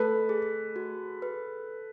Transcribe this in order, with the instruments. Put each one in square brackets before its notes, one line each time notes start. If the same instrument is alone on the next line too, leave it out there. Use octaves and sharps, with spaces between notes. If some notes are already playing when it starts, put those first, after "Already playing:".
Already playing: [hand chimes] A3 [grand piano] A4 B4
[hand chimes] G#4
F#4
B4